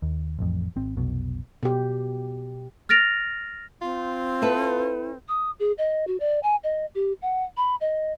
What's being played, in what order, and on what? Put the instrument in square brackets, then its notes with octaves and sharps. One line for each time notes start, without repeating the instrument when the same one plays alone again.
[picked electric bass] D#2
A1 F2
G#1 C4
F1 B1 B2
[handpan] B2 G4
[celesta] F6 A6 A#6 D7 F7
[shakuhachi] C4 [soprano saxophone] F4
[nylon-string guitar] E4 A4 B4
[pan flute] D#6
G#4
D#5
F#4
D5
G#5
D#5
G4
F#5
B5
D#5